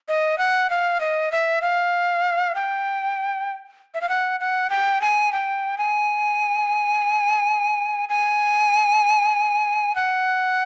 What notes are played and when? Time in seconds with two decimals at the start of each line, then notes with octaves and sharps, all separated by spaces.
0.08 D#5
0.38 F#5
0.70 F5
1.00 D#5
1.32 E5
1.62 F5
2.55 G5
3.94 E5
4.01 F5
4.09 F#5
4.40 F#5
4.70 G5
5.01 G#5
5.32 G5
5.78 G#5
8.09 G#5
9.96 F#5